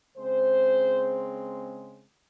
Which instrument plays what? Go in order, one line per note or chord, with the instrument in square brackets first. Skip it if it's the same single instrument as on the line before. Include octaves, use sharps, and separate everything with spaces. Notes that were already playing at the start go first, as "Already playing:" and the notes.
[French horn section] C#3 G#3 C4 C5